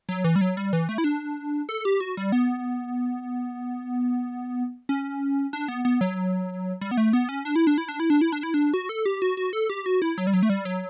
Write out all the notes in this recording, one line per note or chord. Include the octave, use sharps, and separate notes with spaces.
F#3
E3
G3
F#3
G3
E3
A3
E4
D4
A4
G4
F#4
G3
B3
C#4
D4
B3
B3
F#3
G3
B3
A3
B3
C#4
D4
E4
D4
E4
D4
E4
D4
E4
D4
E4
D4
F#4
A4
G4
F#4
F#4
A4
G4
F#4
E4
F#3
G3
F#3
A3
G3
F#3